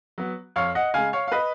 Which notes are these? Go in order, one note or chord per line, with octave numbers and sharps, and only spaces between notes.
F#3 B3
F2 C#5 F5
D#5 F#5
C#3 G#3 F5 G#5
C#5 F5
F5
B4 D#5